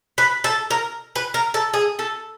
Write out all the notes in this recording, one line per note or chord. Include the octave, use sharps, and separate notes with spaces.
B4
A4
A#4
B4
A#4
A4
G#4
A4